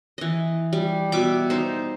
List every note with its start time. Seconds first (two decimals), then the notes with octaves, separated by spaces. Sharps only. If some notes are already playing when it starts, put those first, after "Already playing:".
0.18 E3 D#5
0.73 G3
1.12 B2 E5 D6
1.50 D#4 C5